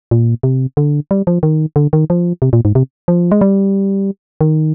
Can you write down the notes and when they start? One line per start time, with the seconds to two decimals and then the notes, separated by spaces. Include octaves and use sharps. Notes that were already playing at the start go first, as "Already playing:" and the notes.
0.11 A#2
0.43 C3
0.77 D3
1.11 G3
1.27 F3
1.43 D#3
1.76 D3
1.93 D#3
2.10 F3
2.42 C3
2.53 A#2
2.65 G#2
2.75 C3
3.08 F3
3.32 G#3
3.41 G3
4.41 D#3